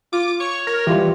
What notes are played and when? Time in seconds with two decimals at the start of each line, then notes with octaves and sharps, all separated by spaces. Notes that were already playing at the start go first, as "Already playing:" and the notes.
0.13 F4 D6
0.40 C#5 C#6
0.67 A#4
0.87 E3 G3 F4 G4